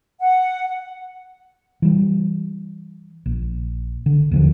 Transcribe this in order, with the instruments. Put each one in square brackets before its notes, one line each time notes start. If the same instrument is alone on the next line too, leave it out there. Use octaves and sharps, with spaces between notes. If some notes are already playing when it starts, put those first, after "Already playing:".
[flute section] F#5
[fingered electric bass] E3 G3
A#1
D3
D#2 D3 F3